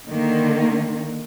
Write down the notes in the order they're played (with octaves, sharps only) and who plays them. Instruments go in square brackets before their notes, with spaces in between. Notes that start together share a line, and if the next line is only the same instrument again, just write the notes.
[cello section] D3 D#3 A#3